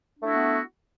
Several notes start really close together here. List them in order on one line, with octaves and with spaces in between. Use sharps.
D4 A3 E4 F#4 B3